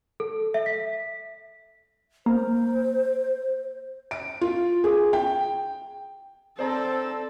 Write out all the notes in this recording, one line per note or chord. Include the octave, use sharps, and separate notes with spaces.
A4
E5
B6
A#3 C5
D7
F4
G#4
G5
C4 A4 C5 D5 A#5